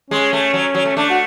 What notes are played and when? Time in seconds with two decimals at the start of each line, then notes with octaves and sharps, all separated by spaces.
0.10 G#3 C#4
0.33 A3
0.54 F#3
0.75 F#3
0.85 A3
0.97 A3 D4
1.10 F#4